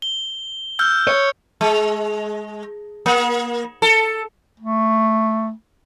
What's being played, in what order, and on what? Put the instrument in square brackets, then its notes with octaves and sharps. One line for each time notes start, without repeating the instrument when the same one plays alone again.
[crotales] G7
E6 F6 G6
[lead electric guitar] C#5
[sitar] G#3
A#3
A4
[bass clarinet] A3